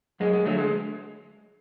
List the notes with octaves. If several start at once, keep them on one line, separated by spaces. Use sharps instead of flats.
F#2 G#3
G#3
D3 F#3 A3
G#3